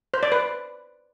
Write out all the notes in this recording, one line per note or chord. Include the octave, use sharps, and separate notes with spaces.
C5
D5
B4